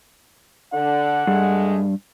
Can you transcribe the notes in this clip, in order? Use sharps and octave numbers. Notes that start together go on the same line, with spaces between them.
D3 F#5
G2 G#3 A3 G#4